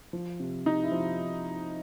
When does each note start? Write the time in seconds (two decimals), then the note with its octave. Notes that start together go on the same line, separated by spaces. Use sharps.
0.13 F3
0.40 C3
0.66 C3 D#4
0.84 E4
0.92 F3